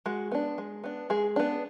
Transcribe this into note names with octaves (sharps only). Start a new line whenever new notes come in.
G#3 F#4
B3 D4
G#3
B3 D4
G#3 G#4
B3 D4